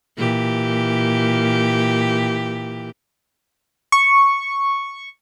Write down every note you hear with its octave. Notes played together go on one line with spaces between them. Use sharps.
A#2 E3 G4
C#6